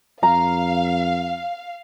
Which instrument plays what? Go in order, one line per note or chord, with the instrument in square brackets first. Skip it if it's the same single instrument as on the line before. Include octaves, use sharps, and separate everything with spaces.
[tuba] F2 [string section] F5 [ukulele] A#5